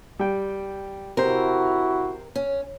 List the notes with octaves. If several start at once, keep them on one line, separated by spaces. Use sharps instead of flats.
G3 G5
C3 E4 F#4 A#4 C5
C#4